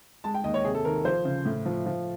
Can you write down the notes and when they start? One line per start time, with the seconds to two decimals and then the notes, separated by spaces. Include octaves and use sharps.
0.24 G#3 A5
0.34 G5
0.44 D#2 D#5
0.54 C#5
0.65 C3 G#4
0.75 A4
0.85 D#3 A#4
1.05 F3 C5
1.25 C#3
1.45 A2
1.66 F3
1.86 F3